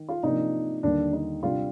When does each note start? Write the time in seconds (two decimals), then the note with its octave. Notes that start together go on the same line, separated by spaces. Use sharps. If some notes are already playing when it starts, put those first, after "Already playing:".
Already playing: D#3
0.09 F4
0.23 C3 F3 A#3 D4 D#4
0.83 D#2 D3 G3 D4
1.13 D#4
1.43 C3 G3 D4 F4